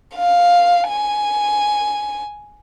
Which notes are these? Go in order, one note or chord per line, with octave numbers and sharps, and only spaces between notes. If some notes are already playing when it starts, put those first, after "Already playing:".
F5
G#5